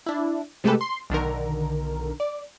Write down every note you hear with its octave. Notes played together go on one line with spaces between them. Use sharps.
D4 E4
C3 G#3 A3 G4 A4 B4
C6
B1 D3 D#3 A#4
D5